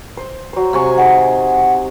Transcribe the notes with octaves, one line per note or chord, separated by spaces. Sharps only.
C5
F#3 C5
C3 G#5 C#6
D#4 G#4 D#5 F#5